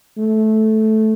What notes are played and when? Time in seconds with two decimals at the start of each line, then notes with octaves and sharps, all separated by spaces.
0.17 A3